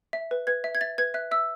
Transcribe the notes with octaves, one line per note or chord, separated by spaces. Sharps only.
E5
B4
B4 G#6
E5
G#6
E5 A6
B4 G#6
E5 F#6
E5 E6